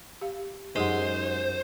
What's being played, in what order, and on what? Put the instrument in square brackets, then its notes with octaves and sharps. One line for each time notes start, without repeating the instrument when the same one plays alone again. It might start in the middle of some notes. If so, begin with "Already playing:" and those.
[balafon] G4 F5
[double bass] F#2 [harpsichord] G#3 [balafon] D#4 G4 F#5 [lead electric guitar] C5